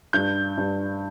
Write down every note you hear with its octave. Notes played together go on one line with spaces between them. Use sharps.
G2 G6
G2